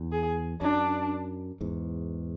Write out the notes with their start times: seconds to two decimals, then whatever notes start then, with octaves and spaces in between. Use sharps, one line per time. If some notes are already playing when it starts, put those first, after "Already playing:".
Already playing: E2
0.12 G#4
0.61 F#2 D4
1.61 E2 G#2